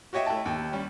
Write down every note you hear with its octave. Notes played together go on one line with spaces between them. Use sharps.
F#4 G4 C#5 D#5 E5 G5
A3 E4 G5 A5
D#2
G3 C#4